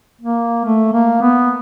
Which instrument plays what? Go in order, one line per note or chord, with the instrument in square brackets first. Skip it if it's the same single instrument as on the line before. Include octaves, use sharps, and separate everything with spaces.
[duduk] A#3
A3
A#3
B3